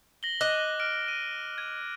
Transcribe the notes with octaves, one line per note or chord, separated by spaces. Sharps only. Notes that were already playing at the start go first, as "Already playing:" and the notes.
A#6 F#7 G7
D#5 D6 F#6 A#6
F6 D7
D#7
G#6 D#7